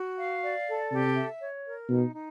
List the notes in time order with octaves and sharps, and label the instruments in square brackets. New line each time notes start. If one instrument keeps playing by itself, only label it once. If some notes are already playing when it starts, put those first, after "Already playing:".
Already playing: [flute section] F#4
F5
D5
A4
[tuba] C3 [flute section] G4
[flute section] E5
C#5
A#4
[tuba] B2 [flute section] D#4
[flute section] D#4